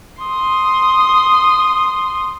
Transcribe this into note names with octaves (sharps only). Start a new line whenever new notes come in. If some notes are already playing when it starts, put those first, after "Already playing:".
C6 D#6